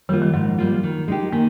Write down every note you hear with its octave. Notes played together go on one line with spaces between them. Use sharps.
D#3 G3 A#3 F4
F3
G#2 G#3
G3 A#3 F4
D#3
G#3 D#4 G4
D#3 A#3